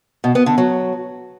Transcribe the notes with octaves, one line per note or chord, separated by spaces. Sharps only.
B2
B3
D3
F#3